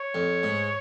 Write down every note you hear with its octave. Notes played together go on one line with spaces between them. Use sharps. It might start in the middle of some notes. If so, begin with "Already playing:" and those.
Already playing: C#5
F2
G#2